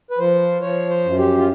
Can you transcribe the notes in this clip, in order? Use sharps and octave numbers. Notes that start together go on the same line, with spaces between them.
B4
F3 C5
F3 C#5
C5
F#2
G4
F4